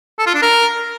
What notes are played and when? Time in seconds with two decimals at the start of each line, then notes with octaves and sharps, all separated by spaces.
0.19 A4
0.27 F4
0.34 D4
0.42 A#4